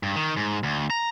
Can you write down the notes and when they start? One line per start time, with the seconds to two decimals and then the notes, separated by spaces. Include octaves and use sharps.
0.03 G2
0.16 D#3
0.37 G#2
0.63 D2
0.90 A#5